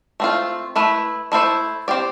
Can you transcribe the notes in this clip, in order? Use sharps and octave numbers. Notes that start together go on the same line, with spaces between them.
A3 C4 F4
A3 E4 B4
A3 E4 A4 C5
C4 G4 D5